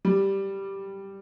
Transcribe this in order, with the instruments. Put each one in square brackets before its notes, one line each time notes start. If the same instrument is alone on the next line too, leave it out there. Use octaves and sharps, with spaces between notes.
[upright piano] G3